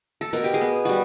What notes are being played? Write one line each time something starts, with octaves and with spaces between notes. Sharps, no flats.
A4
B2 A#4
G4
G#4
B3
G3 F#4